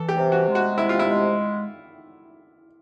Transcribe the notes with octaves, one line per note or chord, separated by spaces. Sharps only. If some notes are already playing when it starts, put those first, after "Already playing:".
Already playing: E3 A4
G4
C3
F#4
G#3
F#4
C3 E4
F4
E4
G#3